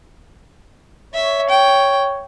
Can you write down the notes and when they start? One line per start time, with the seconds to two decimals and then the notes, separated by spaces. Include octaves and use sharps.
1.14 C#5 E5
1.49 G5